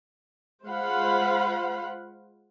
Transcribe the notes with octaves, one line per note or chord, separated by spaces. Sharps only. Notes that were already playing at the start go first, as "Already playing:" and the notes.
G#3 F4 C5 F5 F#5 B5